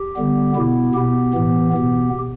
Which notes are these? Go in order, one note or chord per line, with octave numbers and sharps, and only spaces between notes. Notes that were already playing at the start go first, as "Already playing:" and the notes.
Already playing: G4
D3 G3 B3
B2 B3 E4
B2 B3 G4
A2 E3 B3
B2 B3